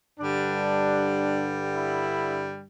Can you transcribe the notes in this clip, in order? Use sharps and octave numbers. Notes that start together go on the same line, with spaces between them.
G2 D3 G3 D4
E4